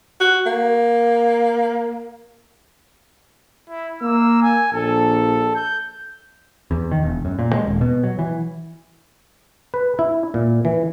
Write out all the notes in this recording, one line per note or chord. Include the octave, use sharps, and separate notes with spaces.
F#4
A#3
E4
A#3 E6
G#5
A#1 A4
G6
E2
D#3
E1
F#2
A#2
G#3
D#1
B2
F#3
E3
B4
E4
A#2
E3